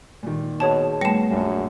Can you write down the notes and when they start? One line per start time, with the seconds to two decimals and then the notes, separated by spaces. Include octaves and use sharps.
0.23 A#2 D#3
0.60 B2 G#4 C#5 A5
1.01 G3 A3 B3 C#7 E7
1.30 A#1 F#2 A#2